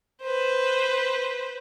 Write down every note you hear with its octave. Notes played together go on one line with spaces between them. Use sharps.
B4 C5